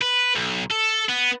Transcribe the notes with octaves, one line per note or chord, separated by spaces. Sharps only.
B4
B1
A4
B3